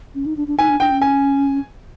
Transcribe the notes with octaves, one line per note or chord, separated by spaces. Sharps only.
C#4
D#4
D4
D4
D#4 G#5
D4
D4 G5
C#4
G#5